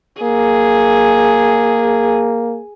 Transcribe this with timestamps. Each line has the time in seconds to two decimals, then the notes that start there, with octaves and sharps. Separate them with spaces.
0.22 A#3 G#4